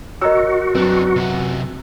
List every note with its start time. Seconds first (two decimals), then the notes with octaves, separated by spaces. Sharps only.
0.22 F#4 A#4 C#5 D#5 A#5 E6
0.75 F#2 C4 D4 B4
1.16 C3 F#5